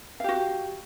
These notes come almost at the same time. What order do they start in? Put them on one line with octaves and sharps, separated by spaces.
F5 G4 F#4